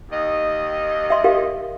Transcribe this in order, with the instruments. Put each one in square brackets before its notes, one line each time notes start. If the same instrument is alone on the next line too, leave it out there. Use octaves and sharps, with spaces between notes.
[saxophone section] D#2 D#3 D#5
[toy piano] E5 C6
G4 A#4 F5